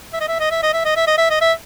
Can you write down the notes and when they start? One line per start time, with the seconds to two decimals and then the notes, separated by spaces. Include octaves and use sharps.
0.13 E5
0.20 D#5
0.28 E5
0.40 D#5
0.51 E5
0.63 D#5
0.73 E5
0.85 D#5
0.96 E5
1.07 D#5
1.18 E5
1.30 D#5
1.41 E5